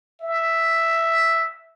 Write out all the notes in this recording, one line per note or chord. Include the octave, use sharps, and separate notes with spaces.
E5